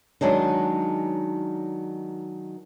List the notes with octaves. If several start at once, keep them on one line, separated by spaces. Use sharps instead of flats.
D#3 F#3 G#3 D4 D#4